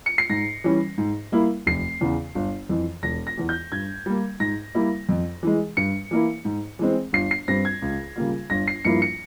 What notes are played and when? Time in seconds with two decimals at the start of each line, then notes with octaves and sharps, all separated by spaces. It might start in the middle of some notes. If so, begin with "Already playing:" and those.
0.06 C#7
0.18 C7
0.30 G#2 A#6
0.64 E3 G3 C#4
0.98 G#2
1.32 G3 A#3 E4
1.67 F1 C7
2.01 E2 C#3
2.35 G1
2.69 F2 E3
3.03 E1 A#6
3.27 A#6
3.37 E2 E3
3.49 G6
3.72 G2 G#6
4.06 G3 A#3
4.40 G#2 A#6
4.75 G3 A#3 E4
5.09 F2
5.43 E3 G#3
5.77 G2 C#7
6.11 E3 A#3 E4
6.45 G#2
6.79 E3 G#3 C4
7.13 G1 C7
7.31 C7
7.48 G2 G3 C4 A#6
7.65 G#6
7.82 C#2
8.16 C#3 G3 A#3 F4
8.50 G1 A#6
8.68 C7
8.85 G2 F3 A#3 E4 C#7
9.02 C#7